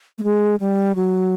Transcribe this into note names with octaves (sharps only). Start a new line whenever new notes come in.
A3
G#3
G3
F#3